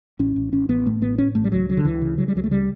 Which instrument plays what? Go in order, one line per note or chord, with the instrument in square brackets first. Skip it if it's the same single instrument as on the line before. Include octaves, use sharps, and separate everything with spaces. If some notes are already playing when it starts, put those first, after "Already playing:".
[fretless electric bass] A1 C#4
A1
A1 C#4
A1 B3
A2 A3
A1 B3
A2 C#4
A1 A3
G3
C#2 F#3
C#3 F#3
D3
C#2 E3
C#3
C#3 F#3
G3
C#2 F#3
A3
C#3 G3